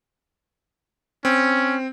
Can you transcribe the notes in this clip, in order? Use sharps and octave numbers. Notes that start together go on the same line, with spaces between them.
C4 C#4